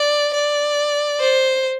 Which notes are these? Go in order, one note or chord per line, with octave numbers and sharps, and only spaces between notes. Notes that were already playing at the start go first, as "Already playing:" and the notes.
Already playing: D5
D5
C5